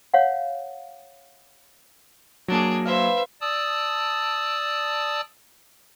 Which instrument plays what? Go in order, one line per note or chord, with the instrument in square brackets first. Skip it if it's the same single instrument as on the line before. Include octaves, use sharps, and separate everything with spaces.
[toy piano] C#5 F5 F#5
[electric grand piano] F#3 A#3 [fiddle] D4 G#4
[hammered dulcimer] B4 F5 [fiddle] C5 E5
[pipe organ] D5 A5 D#6 E6